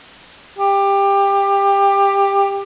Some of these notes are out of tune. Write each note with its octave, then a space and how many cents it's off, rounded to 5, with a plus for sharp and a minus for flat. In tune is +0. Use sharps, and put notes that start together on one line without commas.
G4 +20